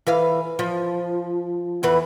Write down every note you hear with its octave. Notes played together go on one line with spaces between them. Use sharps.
E3 B4 F5
F3
E2 E3 B4